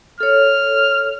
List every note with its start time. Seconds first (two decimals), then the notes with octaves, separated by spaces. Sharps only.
0.20 A4 C#5 F6